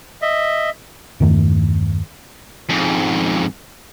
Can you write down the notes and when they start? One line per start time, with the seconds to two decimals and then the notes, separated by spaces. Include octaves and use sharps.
0.22 D#5 E5
1.20 E2 G2 D#3 A3
2.69 F2 G#2